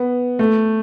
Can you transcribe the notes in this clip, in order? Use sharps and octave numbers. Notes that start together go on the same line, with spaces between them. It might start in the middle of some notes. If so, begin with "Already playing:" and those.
Already playing: B3
A3